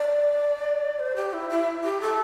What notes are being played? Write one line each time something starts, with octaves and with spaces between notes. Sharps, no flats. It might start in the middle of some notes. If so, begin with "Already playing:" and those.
Already playing: D5
C5
G4
E4
E4
G4
A4